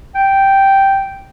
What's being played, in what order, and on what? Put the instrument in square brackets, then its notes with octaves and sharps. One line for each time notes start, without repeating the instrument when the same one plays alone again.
[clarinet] G5